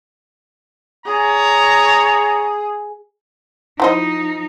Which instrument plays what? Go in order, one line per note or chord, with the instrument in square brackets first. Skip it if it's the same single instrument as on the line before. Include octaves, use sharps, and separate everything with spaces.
[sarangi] G#4 [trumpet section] C#5 A#5
[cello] F3 D#4 [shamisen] E4 C5 D#5